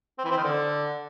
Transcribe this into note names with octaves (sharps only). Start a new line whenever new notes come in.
C4
E3
C4
D#3
D3